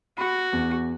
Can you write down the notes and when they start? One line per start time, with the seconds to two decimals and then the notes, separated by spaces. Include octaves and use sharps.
0.18 F#4 B5
0.53 E2